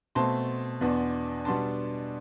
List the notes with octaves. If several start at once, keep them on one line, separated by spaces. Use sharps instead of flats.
B2 A3 C4 A5 C6
E2 B2 B3 D4
B2 G3 B3 D4 A5 C6